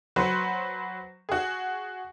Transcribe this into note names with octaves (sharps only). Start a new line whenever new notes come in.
F#3 F#4 B4 C5
F#4 G#4